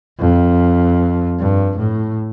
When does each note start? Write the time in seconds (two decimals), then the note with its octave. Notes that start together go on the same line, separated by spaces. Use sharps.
0.19 F2
1.39 G2
1.79 A2